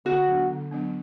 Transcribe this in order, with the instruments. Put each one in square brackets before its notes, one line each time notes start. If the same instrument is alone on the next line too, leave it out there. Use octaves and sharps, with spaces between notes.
[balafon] D3 [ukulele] F#4
[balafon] F#3 B3 D4
D3
F#3 B3 D4